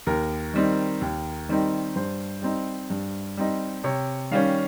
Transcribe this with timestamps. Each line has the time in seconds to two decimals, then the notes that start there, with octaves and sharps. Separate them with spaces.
0.07 D#2 A#4
0.54 D#3 G3 C4 D#4
1.01 D#2
1.49 D#3 G3 C4 D#4
1.96 G2 C5
2.42 G3 C4 D#4
2.90 G2
3.37 G3 C4 D#4
3.84 C3 C#5
4.31 D#3 G3 C#4 F5